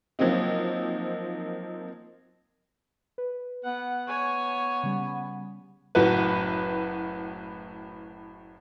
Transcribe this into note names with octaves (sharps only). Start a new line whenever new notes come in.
F3 F#3 A#3 C4 D#4
B4
B3 F#5
C#5 G#5
C#3 G3
F#1 A2 F#4 B4